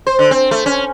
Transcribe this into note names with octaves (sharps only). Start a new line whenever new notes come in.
C5
D3
C4
A3
C#4